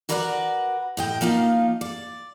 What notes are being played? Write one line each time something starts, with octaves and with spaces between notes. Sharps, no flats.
F#4 A#4 B4 D5 E5 F#5
A2 D#5 G5
F3 A#3 D#4 F4
D5